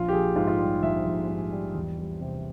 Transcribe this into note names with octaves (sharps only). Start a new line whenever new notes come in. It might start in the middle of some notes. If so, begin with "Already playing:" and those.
Already playing: A#1 F4
G4
A#1 G#4
G#2 F4
F4
G3 G4
A#1 E5
A#1
G#2
G3
E2
G3
C3